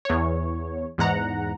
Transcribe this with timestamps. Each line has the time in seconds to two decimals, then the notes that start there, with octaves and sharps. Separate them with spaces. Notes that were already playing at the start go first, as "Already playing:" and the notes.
0.05 E2 C#5
0.98 E2 G#2 F#5 A#5